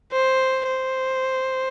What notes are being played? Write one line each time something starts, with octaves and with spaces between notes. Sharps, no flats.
C5
C5